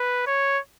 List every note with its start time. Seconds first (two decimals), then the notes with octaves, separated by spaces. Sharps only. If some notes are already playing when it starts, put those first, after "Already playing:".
Already playing: B4
0.26 C#5